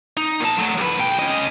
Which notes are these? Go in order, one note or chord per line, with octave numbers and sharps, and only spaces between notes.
D#4
A#2 A5
F#3 A3
D#2 B4
B1 G5
C#4 D#5